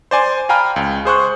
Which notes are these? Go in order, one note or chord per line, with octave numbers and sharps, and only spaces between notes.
C5 D5 G#5 C6
F5 G5 G#5 A#5 B5 F6
C#2
G#4 C5 C#6 F#6